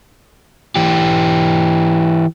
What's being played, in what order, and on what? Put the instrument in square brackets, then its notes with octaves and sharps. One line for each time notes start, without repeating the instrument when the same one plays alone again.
[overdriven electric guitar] E3 G4